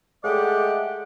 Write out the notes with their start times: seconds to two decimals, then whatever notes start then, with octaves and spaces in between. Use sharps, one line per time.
0.24 G#3 A3 G4 D5 D#5 F#5